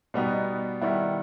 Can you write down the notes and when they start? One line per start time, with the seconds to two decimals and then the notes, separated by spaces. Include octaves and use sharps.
0.14 B2 G3 B3 D#4
0.81 D#3 G3 B3 E4